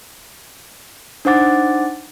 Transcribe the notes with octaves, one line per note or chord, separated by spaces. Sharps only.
D4 D#4 C5 F#5 D6 A6